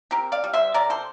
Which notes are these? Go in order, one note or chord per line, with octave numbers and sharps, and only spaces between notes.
C4 G4 A#4
D5 F5
G3
C5 E5
C3 A#4 D5
A4 C5